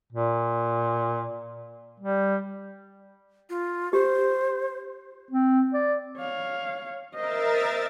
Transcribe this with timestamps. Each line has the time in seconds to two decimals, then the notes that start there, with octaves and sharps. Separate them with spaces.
0.12 A#2
2.00 G3
3.50 F4
3.93 G4 C5
5.31 C4
5.74 D5
6.18 C#5 F5
7.15 A#4 C5 D#5 E5 A6